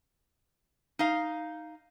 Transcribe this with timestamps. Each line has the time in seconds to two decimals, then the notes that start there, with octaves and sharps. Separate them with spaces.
0.99 D#4 F5